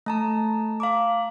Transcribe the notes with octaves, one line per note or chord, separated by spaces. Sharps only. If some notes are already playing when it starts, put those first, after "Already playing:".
A3 A5 A#5
F5 A#5 D6